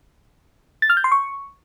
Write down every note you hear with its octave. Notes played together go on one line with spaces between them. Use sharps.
A6
F6
G6
C6
C#6